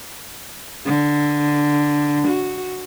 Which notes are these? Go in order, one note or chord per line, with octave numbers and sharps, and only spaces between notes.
D3
F#4